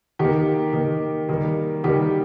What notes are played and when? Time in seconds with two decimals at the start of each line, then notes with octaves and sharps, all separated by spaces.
0.19 D#3 A#3 G4
0.73 D#3 A#3
1.28 D#3 G3 A#3
1.84 D#3 G3 A#3 G4